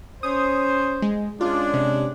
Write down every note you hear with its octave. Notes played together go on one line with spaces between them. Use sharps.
C#4 C5 D#6
G#3
G#3 C#4 D4 F4
C3